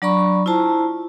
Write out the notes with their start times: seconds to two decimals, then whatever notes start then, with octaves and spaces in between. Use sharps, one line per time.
0.02 F#3 D4 D5 A#5 B5 C#6
0.46 E4 F4 C5 A5 A#5